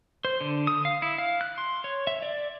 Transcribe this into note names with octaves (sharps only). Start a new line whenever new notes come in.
C5
D3
D#6
F5
E4
F5
F#6
C6
C#5
E5
D5